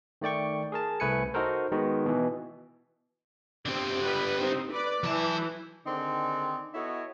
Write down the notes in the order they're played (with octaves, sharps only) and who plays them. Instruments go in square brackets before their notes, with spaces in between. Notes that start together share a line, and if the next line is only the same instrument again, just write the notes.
[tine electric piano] D#3 A3 D5 G5 C#6
G#4 A#4 A5
C2 A3 B4 G#5 C#7
D#4 F#4 A4 A#4 C5
D#3 G#3 B3 D#4 F#4
B2 E3
[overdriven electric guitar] D3 G4 [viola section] C4
[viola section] G3 B4
C4 D#4
B4 D5
[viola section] E3 [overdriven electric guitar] F#3 A5
[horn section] D3 D#3 C4 D#4 G#4 D5
B3 E4 F#4 A4 C#5 D#5